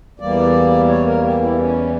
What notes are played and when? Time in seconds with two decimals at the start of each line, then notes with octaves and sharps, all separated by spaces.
0.20 E2 E3 G3 A#3 D5
0.89 C#5
1.06 A#4
1.23 G4
1.41 E4
1.51 A#3
1.58 C#4